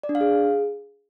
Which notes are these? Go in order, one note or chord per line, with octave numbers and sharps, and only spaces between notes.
D5
D4
F5
G#4